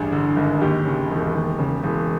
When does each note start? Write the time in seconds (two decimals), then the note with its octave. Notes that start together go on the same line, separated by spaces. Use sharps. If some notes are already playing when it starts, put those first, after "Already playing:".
Already playing: A1 G2 G#4
0.12 D3
0.36 G#1
0.61 D#2 G4
0.86 C#3
1.11 E1
1.34 D#2
1.59 C#3
1.83 E1